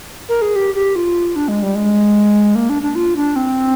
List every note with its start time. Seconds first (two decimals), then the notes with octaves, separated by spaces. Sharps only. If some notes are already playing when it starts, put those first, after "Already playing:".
0.29 A#4
0.42 G#4
0.56 G4
0.75 G4
0.96 F4
1.36 D4
1.48 G#3
1.63 G3
1.75 G#3
2.55 A#3
2.70 D4
2.82 D4
2.95 F4
3.16 D4
3.36 C4